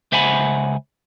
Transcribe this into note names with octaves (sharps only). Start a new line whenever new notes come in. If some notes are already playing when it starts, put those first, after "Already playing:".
C#2 C5 E5 F#5 G#5 B5